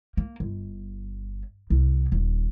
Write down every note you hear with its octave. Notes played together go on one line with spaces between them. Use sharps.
A#3
G1
C2
D#1